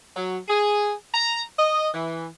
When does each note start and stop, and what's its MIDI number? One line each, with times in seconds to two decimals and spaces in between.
0.16 0.37 54
0.48 0.92 68
1.14 1.41 82
1.58 1.89 75
1.93 2.25 52